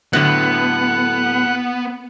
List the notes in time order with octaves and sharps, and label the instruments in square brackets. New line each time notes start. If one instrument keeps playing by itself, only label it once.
[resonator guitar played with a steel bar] A2 D3 F#3 [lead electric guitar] B3 [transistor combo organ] F#5